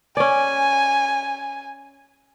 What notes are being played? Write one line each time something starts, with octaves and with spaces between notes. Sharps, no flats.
C#4 D5 G#5